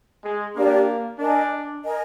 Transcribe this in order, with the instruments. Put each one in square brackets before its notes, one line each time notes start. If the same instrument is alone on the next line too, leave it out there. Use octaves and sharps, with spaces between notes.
[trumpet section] G#3
[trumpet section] A#3 [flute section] D4 G4 D5
[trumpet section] D4 [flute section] A#4 D#5 G#5
[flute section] A#4 D#5 G#5